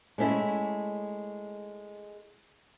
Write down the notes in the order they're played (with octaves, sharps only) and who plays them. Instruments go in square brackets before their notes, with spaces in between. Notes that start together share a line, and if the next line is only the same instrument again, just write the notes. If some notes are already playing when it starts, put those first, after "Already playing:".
[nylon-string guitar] G#3 A3 C#4 E4